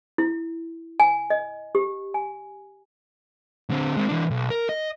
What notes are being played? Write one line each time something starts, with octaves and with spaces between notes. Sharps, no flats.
E4
G#5
D#5
G4
G#5
D3 C4
G#3 C4
E3 D4
B1
A#4
D#5